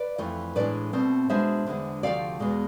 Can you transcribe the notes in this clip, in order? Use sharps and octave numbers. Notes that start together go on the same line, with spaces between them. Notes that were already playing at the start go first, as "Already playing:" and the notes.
Already playing: B4 D5
F2 E3 A3
A2 E3 G#3 D4 B4 D5
B2 A3 C4
B2 G#3 D4 C5 E5
E2 D3 G#3 D4
D2 C3 F3 A3 D5 F5
E2 B2 G#3